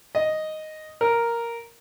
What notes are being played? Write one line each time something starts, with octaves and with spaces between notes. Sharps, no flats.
D#5
A#4